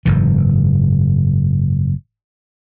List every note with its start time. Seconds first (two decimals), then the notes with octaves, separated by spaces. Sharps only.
0.05 F#1 G#2 E3